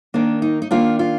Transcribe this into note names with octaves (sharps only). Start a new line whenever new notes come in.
D#3 A#3 D4
D#4
D#4
D#3 A#3 D4 F4
F4